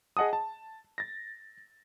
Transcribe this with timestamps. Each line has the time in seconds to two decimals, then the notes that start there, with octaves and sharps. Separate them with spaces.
0.17 G#4 D#5 F#5 A5 D#6
0.33 A5
0.98 A6 A#6